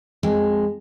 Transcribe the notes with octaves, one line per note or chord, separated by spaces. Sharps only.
F2 G#3